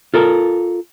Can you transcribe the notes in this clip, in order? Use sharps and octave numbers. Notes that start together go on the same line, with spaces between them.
F4 A4 A#4